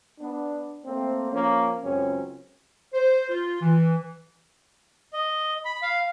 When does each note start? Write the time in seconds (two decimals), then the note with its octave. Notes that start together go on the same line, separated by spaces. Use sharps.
0.20 B3 D4
0.85 A3 A#3 C4
1.32 F3 A#3 C#4
1.83 C#2 F#2 C4 C#4
2.93 C5
3.29 F4
3.61 E3
5.13 D#5
5.65 B5
5.82 F5